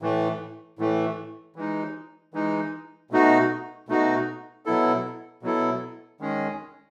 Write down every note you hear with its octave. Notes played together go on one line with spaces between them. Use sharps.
A2 E3 A3
A2 E3 A3
E3 G#3 D#4
E3 G#3 D#4
B2 A3 D#4 F#4
B2 A3 D#4 F#4
B2 F#3 B3 E4 A4
B2 F#3 B3 E4 A4
D#3 G#3 C#4 G#4